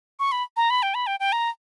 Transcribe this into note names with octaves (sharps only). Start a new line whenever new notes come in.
C#6
B5
A#5
B5
G5
B5
G5
G5
A#5